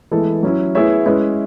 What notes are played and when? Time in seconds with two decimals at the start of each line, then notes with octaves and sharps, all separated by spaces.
0.11 E3 G#3 B3 E4 A4
0.43 F#3 C#4 E4
0.75 B3 E4 G#4 C#5 E5
1.06 G#3 C#4 E4 B4